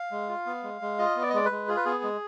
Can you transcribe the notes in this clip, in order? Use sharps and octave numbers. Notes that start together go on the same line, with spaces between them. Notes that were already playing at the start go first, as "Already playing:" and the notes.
Already playing: F5
G#3
F4
B3
G#3
G#3
F4 D#5
B3
D5
D#5
G#3 D5
B4
G#3
F4 G#4
B4
B3 G#4
G#3